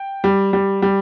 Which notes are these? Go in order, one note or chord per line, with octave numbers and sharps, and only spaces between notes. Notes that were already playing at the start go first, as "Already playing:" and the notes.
Already playing: G5
G3
G3
G3